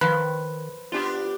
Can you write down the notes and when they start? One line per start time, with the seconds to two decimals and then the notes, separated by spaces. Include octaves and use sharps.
0.01 D#3 F3 B4
0.92 B3 D4 F4 G4